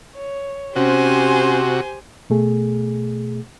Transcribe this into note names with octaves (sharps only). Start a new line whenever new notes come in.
C#5
C3 C#4 F#4 G4 C5 G#5
B2 A3 G#4